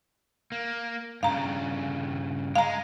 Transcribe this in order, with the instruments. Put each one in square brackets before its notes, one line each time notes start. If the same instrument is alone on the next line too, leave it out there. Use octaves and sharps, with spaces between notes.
[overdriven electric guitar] A#3
[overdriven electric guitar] G2 C#3 [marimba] F5 A#5
[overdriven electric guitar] G#3 [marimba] F5 A#5